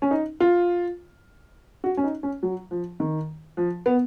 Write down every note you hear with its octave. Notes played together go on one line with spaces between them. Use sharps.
C#4
D#4
F4
F#4
C#4
D#4
C#4
F#3
F3
D#3
F3
B3